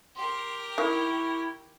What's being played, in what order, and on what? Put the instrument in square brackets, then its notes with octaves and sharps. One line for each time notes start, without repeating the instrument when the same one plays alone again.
[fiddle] G4 A#4 [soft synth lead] C6
[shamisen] D#3 [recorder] E4 [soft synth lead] C#6